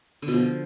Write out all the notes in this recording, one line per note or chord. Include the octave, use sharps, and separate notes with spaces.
D3
B2
F3